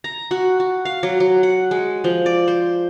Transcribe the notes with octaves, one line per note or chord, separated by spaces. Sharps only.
A#5
F#4
F#4
F5
F#3
F#3
F#5
G#3
F3
D5
C5